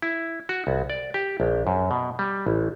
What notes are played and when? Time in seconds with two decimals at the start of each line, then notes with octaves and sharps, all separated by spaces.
0.02 E4
0.49 F#4
0.67 C2
0.90 D5
1.14 G4
1.40 A#1
1.67 F#2
1.91 B2
2.19 G3
2.47 A1